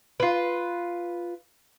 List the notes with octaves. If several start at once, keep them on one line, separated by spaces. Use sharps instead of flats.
F4 B4